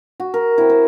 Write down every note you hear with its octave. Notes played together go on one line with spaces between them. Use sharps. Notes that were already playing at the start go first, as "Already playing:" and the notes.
F#4
A#4
C4 E4
C5